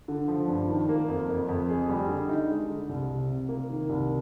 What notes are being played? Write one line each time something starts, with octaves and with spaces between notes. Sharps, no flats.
D3
F3
G2
D#3
A#3
F2
F2
F2
G#4
G3
D3
D#4
G#3
D3
C2
C3
C3
A#3
D#3
C2